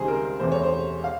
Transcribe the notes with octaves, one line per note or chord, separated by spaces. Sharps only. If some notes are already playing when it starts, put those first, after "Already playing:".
Already playing: C#2 C3 D#3 G3 G#4 C5
A#4
E1 E2 C3 E3 A3 C5
C#5
C5
F5